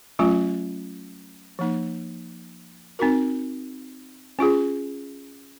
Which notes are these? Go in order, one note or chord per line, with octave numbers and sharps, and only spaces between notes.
F#3 A3 C#4 F4
F3 A#3 D#4
C4 D#4 F#4 A#4
C#4 F4 G#4